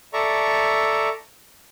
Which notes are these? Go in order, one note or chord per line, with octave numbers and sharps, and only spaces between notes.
A4 D5 E5 A#5 C#6